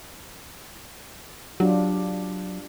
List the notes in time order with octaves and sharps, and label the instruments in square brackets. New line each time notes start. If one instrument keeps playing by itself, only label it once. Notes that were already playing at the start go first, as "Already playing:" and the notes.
[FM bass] F#3 [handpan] D4 F4 G4